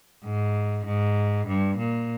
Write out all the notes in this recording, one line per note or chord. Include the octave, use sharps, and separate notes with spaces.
G#2
G#2
G2
A#2